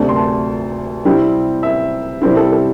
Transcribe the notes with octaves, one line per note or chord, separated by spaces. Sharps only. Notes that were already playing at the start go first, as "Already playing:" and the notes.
Already playing: D2 C3 A3 D4
C6
A5
C3 G3 C4 E4
E5
C3 G3 C4 E4 C5
A4
A4